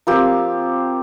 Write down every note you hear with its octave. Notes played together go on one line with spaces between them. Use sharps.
F3 A#3 C4 G4